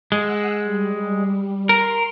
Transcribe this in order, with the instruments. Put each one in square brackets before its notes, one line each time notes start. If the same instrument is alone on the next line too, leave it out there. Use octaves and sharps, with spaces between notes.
[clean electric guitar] G#3 [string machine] F#5 E6 F#6
[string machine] G3
[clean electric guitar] A#4 [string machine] C6